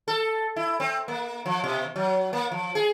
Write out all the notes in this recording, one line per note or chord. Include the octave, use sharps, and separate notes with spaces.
A4
E4
C4
A#3
F3
B2
F#3
A#3
F3
G#4